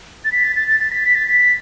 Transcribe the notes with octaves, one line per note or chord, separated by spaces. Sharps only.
A6
B6
A6
A6
A6
A6
B6
B6
A6
B6